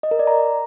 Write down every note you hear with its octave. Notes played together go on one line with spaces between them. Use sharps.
D#5
A#4
D5
A#5